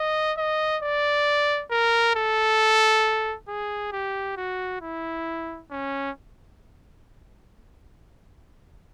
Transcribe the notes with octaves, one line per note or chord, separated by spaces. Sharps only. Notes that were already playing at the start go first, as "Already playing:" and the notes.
Already playing: D#5
D#5
D5
A#4
A4
G#4
G4
F#4
E4
C#4